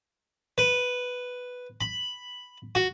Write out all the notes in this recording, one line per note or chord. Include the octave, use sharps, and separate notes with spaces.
B4
B5
F#4